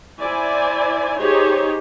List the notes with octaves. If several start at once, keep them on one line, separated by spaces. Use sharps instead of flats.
E4 C5 D5 G#5
D#4 G4 G#4 C5 C#5